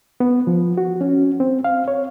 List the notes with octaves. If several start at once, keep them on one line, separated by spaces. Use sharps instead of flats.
B3
F3
F#4
C#4
C4
F5
C#5